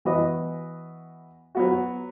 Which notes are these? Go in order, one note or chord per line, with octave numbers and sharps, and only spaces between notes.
E3 B3 F#4 B4 D#5
F#3 B3 F#4